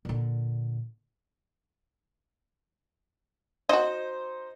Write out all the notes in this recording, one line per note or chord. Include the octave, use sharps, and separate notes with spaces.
A#2 D3
D#4 F#4 C5 D#5